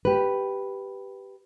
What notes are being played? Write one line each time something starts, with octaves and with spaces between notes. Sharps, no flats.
G4 B4